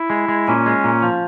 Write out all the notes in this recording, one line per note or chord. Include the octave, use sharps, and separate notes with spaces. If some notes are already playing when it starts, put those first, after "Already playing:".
Already playing: E4
G#3
G#3
A#2 C#4
G#3
A#2
F3